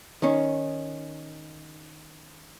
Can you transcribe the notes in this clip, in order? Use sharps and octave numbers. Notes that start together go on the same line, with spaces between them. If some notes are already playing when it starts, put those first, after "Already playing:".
D#3 C#4